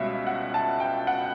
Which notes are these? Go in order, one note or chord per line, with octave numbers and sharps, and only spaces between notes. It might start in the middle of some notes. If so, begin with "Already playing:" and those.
Already playing: C#2 B2 G3 C#4 E5
F#5
A5
G5
F#5